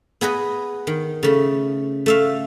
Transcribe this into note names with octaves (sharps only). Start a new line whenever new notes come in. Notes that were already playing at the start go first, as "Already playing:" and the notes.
B3 G#4 B4 D#5
D#3
C#3 A3
A3 E5 F5